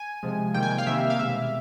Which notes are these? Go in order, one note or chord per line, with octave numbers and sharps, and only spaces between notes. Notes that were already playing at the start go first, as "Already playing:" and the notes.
Already playing: G#5
C3 F3 G#3
C3 D#3 G3 A#3 G5
G#5
G5
F5
C3 D#3 G3 A#3 E5
F5
B2 G#3 E5